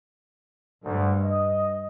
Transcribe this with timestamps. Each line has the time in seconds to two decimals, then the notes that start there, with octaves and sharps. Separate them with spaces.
0.85 D2 G2 D3
1.23 D#5